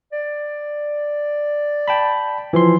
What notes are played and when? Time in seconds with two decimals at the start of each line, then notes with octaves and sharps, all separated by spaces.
0.12 D5
1.88 G5 A5 B5
2.53 E3 F3 C6